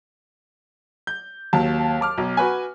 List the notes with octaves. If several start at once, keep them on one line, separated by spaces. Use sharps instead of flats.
G6
D#2 F#3 A5
A5 D6 F6
B1
F#4 B4 G#5